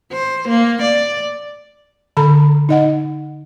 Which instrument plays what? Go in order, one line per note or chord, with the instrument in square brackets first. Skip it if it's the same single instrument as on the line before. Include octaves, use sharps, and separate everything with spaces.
[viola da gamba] C5
A#3
D5
[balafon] D3 A4 A#5 B5
D#4 D#5 F#5